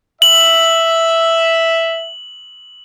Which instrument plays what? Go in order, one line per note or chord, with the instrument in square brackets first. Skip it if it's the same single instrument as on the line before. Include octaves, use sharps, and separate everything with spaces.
[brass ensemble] E5 [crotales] F#7